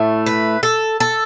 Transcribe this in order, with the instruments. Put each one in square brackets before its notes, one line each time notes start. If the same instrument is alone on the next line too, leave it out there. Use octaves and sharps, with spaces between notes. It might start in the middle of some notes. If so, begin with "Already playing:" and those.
Already playing: [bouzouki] A2 A3
B4
A4
A4